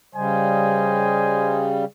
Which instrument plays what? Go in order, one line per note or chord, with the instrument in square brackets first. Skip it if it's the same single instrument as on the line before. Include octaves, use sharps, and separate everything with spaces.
[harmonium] C#3 G3 [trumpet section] C5 D#5 G#5